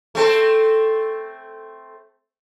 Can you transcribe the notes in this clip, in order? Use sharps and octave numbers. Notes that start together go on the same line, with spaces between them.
A3 C4 A4